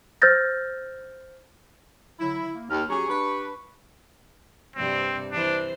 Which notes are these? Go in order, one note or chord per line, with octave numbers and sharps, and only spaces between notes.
C5 E6 F6 G6 A6 A#6
D3 F#3 E4
A#3
D#2 F6
F#3 C#4 G4 G#4 C#6
D4 B4
G2 C3 C4 D5
E3 D4 C5